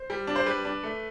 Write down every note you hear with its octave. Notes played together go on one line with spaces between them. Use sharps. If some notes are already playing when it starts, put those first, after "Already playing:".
Already playing: C5
G3
D4
C5
G3 B4
D4
A3